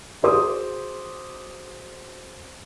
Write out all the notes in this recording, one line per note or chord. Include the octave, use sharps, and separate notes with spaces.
F#4 G#4 C5 D6 D#6